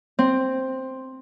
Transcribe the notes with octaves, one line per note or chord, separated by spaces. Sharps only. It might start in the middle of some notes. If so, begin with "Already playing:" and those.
C4